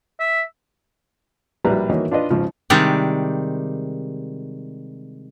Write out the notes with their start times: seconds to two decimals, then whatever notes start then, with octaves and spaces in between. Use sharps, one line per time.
0.20 E5
1.65 A#1 F#3 G3 E4 B4 A#5
1.90 D#3 E3 A#3 F#4 C#5 D#5
2.11 D4 F4 B4 D#5
2.30 G#1 C#3 F3
2.70 C3 D#3 G3 G#3 D5